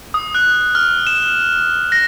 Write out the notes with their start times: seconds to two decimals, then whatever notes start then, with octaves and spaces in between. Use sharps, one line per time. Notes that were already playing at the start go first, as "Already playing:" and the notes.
0.14 D#6
0.35 F#6
0.75 F6
1.07 E7
1.92 A#6